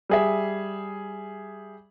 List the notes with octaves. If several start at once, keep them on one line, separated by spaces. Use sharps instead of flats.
G3 G#4 E5